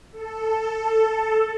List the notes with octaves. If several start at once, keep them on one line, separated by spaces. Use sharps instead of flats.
A4